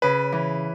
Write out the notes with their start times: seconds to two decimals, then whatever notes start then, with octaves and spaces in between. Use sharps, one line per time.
0.02 C#3 B4
0.32 E3